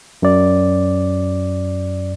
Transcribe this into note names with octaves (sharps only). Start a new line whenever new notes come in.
F#2 D5